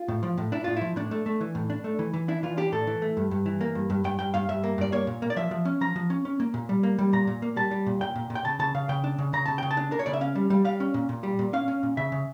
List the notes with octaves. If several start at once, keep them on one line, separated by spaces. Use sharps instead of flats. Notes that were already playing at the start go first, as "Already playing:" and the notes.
Already playing: F4
A2
F3
A2
D4 E4
A2 F4
F3 E4
A2 D4
A3
A3
E3
A2
D4
A3
E3
E3
D4 E4
E3 F4
D4 G4
A2 A4
E3
A3
G2
G2
E3
A#3
G2
G2
G2 G5
G2 G5
G2 F5
G2 E5
A#3
G2 D5
A#3 C#5
A#2
A#3
D5
F3 E5
F3
C#4
F3 A#5
F3
C#4
C#4
A#3
A#2
G3
A#3
G3
A#2 A#5
A#2
A#3
G3 A5
G3
A#2
A#2 G5
A#2
A#2
G5
C#3 A5
C#3 A5
C#3 F5
C#3 G5
D4
C#3
C#3 A#5
C#3 A5
C#3 G5
A5
D4
D4 A#4
C#5
C#3 D5
E5
C#4 F5
G3
G3
G3 F5
C#4
A#2
A#2
G3
A#2
C#4 F5
C#4
A#2
C#3 E5
C#3